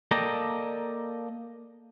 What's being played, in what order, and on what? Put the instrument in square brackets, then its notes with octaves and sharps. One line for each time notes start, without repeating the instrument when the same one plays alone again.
[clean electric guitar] A#3 A4 D5 D#5 G5 A#5